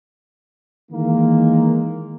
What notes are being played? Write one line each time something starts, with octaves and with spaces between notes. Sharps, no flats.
D#3 E3 G#3 A#3